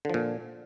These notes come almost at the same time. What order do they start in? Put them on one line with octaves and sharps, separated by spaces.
D3 F3 A#2